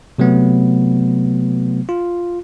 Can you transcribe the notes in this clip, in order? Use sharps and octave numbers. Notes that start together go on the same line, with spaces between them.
C3 F#3 A3 B3
F4